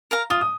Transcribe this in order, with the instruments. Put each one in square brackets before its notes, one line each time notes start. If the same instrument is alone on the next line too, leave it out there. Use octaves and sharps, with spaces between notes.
[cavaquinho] A#4 F5 A#5
[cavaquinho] F4 [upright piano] D#6
[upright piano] D#6